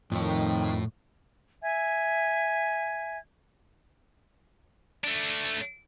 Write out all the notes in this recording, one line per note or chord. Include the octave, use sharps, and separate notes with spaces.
F2 A2 D#3 C#5
E5 G#5 G#6
A3 D4